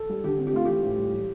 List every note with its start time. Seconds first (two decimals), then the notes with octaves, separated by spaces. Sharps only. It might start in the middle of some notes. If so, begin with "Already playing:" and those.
Already playing: A4
0.09 G3
0.24 D3 G4
0.38 C4
0.47 G4
0.53 A3 F4
0.65 E3 G4
0.83 A2
0.98 G3
1.13 G3